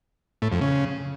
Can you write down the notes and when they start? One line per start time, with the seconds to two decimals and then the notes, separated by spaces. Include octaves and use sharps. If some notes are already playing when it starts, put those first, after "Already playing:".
0.42 A2
0.52 F2
0.61 C#3